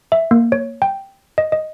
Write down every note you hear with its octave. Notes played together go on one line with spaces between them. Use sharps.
E5
A#3
C#5
G5
D#5
D#5